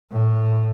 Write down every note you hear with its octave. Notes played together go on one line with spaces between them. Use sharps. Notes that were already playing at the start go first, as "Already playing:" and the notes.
A2